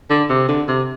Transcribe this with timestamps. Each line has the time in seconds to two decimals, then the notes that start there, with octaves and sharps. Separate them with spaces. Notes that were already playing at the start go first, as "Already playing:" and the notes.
0.10 D3
0.30 C3
0.49 D3
0.68 C3